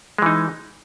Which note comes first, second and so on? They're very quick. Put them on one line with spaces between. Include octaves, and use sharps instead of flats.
G#3 E3 D#4